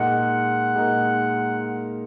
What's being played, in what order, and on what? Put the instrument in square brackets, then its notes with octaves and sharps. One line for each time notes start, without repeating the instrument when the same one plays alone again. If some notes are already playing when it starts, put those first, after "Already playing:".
Already playing: [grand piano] A#2 G#3 D#4 A#4 [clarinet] F#5
[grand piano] A#2 G#3 D#4 A#4